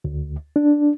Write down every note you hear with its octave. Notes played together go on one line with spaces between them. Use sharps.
D2
D4